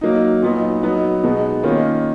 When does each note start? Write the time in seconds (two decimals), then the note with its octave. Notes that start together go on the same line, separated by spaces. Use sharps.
0.01 F#3 A#3 D#4
0.42 A#2 F#3 B3 D#4
0.83 F#3 B3 D#4
1.23 B2 G#3 B3 D#4
1.63 D#3 A#3 C#4 F4